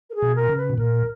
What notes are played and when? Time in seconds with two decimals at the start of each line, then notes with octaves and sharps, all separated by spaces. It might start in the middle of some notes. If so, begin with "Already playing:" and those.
0.10 A#4
0.15 G#4
0.22 B2
0.36 A#4
0.49 C#3
0.57 B4
0.70 B2
0.77 A#2 A#4